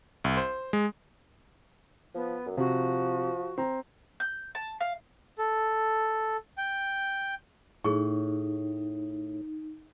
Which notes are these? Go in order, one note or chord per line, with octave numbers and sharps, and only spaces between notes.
C2
C5
G#3
F3 B3
F#2
C3 F3 F#4
C4 A#5
G6
A5
F5
A4
G5
A2 D#4 G#4 C#6